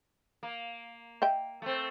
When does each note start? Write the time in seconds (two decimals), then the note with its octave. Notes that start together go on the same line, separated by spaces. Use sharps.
0.43 A#3
1.22 D#5 E5 G5
1.62 A3 C4